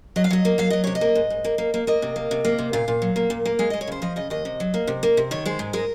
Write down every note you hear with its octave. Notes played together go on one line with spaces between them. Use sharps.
F#3 D#5
F5
F#3 D#5
A#3
F#3 F5
F#3 D#5
C3 C#5
D#5
A#3
G#2
G#2
A#3
A#3
A#3
A#3 D#5
C3
A#3
C3
A#3
C3
A#2 F5
A#2
F#3
A#3
A#2
A#3
G#3 F5
G#3 D#5
C#5
C#3 C5
F3 D#5
C#3 D#5
D#2 D#5
C3
F#3
A#3
C3
A#3
C3
D#3 C#5
G#3 C5
G#2
G#3 A#4